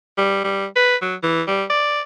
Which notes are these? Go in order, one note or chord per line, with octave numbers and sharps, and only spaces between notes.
G3
G3
B4
F#3
E3
G3
D5